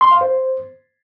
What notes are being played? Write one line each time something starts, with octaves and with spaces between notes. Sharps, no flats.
C6
F5
C5